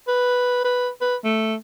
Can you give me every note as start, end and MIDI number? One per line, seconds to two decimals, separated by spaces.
0.08 0.59 71
0.64 0.89 71
1.01 1.16 71
1.24 1.55 57